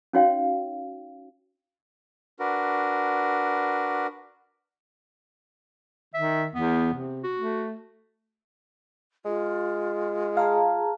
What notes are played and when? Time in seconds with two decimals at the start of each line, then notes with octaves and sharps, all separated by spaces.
0.13 C#4 D#4 F#4 C#5 F5 G5
2.39 D4 F#4 A#4 B4
6.14 D#3 E5
6.55 E2 B3
6.93 C3
7.23 F#4
7.39 A3
9.25 G#3 F4
10.37 G#4 F5 A5 A#5